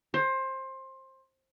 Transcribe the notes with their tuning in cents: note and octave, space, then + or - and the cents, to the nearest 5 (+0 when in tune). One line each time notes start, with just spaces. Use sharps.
C5 +20